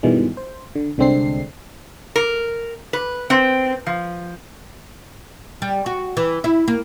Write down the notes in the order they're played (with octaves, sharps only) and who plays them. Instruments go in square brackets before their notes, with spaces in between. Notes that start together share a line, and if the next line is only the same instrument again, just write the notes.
[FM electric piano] G2 B2 D#3 E3 G3 G#3
C5
D3
C2 D3 G#3 C4 D4 C7
[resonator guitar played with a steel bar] A#4
B4
C4
F3
[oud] G3
F#4
E3
E4
A#3